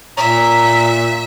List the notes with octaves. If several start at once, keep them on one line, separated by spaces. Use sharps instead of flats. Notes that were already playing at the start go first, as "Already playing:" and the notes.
A#2 E5 A#5